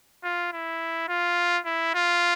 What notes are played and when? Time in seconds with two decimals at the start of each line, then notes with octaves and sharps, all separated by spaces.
0.24 F4
0.53 E4
1.09 F4
1.65 E4
1.94 F4